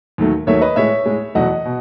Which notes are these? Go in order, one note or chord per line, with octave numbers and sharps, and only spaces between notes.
D#2 D#3 F#3 A3
D#2 D#3 F#3 A3 C#5 E5
B4 D#5
A2 G#3 C#5 E5
A2 G#3
E2 B2 F#3 A3 D#5 F#5
B2